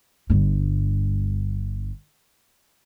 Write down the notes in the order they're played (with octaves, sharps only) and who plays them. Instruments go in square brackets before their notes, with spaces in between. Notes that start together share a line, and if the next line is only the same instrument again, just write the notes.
[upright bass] G1 G2